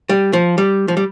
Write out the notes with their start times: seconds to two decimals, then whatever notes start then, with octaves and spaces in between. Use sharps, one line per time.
0.09 G3
0.33 F3
0.58 G3
0.88 F3
0.97 G3